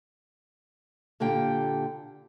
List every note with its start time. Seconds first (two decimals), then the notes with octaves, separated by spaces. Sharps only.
1.20 A#2 D3 A#3 G4 G5